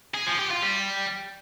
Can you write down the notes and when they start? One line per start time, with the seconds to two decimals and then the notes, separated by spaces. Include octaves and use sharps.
0.14 G#4
0.26 F3
0.38 G4
0.50 F4
0.62 G3